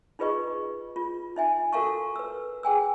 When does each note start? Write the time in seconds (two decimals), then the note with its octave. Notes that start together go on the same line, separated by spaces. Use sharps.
0.19 D#4 F4 G#4 B4 D#5 C#6
0.96 F4
1.36 D#4 E5 G#5
1.73 F#4 A4 A#4 F5 A5 C#6
2.16 B4 E6
2.63 G#4 G5 G#5 E6